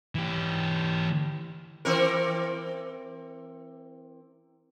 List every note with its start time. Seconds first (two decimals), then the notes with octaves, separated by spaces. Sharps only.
0.15 E3 G4
1.85 E3 C4 A#4